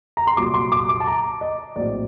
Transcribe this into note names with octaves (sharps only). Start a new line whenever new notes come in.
A#5
C6
C2 A#2 F#3 D6
C6
D6
D6
A5
A#5
D#5
A#1 A2 F#3 C4 D5